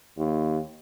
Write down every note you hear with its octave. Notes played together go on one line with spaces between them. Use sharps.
D#2